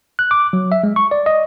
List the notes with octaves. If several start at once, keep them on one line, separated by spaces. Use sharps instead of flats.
F#6
D6
F#3
E5
G#3
C#6
D5
D#5